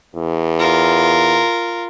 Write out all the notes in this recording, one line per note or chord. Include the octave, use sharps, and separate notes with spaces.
E2
F4 A#4